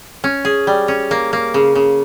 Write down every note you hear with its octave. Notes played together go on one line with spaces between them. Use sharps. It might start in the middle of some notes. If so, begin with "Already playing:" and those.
C#4
G#4
G3
C#4
A#3
A#3
C#3
C#3